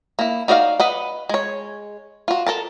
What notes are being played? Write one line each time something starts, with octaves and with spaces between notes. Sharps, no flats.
A#3 E4
D#4 F#4 D5 E5 F5
B4 D#5 F#5
G#3 C#5
F4 F#4
A4 A#4 A5